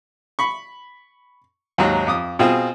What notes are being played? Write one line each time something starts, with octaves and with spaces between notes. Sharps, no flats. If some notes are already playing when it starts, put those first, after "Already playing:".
B5 C#6
D#2 G#2 F#3 A#5
F2 D6 D#6
B2 C4 F4 G#4